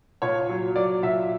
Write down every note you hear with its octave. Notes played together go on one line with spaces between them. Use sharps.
A#2 C#5
F#3
F#3 D5
A#2 E5